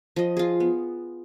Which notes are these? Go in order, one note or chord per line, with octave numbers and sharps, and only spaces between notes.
F3 D#5
F4 G#4
B3